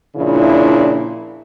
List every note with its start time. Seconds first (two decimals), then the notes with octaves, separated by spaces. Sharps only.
0.16 A#2 C#3 F3 D4 E4